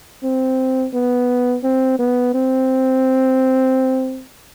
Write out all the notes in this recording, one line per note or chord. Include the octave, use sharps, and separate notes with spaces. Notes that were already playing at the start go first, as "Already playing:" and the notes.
C4
B3
C4
B3
C4